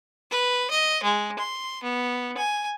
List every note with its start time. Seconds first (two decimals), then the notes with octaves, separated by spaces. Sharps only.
0.31 B4
0.70 D#5
1.03 G#3
1.38 C6
1.83 B3
2.37 G#5